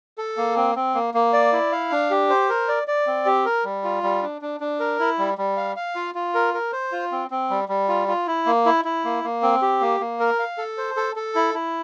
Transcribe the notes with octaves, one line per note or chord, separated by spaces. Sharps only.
A4
A#3
C4
C4
A#3
A#3
D5
E4
F5
D4
G4
C5
A#4
D5
D5
C4
G4
A#4
G3
F4
G3
D4
D4
D4
A#4
E4
G3
G3
F5
F5
F4
F4
A#4
A#4
C5
F4
C4
C4
G3
G3
F4
F4
E4
A#3
E4
E4
A#3
A#3
C4
G4
A#3
A#3
A#4
F5
A4
C5
A4
A4
E4
E4